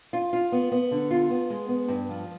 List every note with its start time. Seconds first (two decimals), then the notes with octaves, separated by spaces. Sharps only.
0.13 F4
0.33 F4
0.52 B3
0.72 B3
0.91 D3
1.11 F4
1.30 B3
1.50 G#3
1.69 B3
1.88 G2
2.09 F3